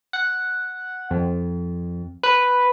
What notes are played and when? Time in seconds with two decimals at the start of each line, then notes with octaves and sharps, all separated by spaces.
0.13 F#5
1.11 F2
2.23 B4